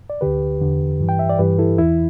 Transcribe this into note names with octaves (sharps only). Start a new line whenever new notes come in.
D5
D2 D3 G4 B4
E2 D3
G2 E3
G5
E5
D5
G2 E3 G4 B4
E4 A4
E2 E3 E4